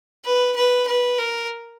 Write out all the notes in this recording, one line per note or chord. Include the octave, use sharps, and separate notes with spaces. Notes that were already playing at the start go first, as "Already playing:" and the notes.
B4
B4
B4
A#4